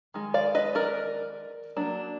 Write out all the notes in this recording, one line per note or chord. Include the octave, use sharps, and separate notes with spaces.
D#3 G#3
D5 F5
B4 D#5
A#4 D5
F#3 A#3 D4